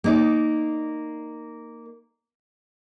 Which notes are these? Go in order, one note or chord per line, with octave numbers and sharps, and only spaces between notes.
A#3 D#4 D5